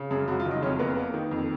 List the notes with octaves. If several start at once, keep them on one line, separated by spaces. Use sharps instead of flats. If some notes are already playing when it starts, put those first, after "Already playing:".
Already playing: C#3
F#2 G#4
F#2 F#4
F4
F#1
D#4
F2 C#4
A#3 B3
A#3
D#3
F2